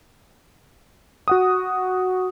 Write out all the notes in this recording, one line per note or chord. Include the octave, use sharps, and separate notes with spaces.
F#4 F#5 D#6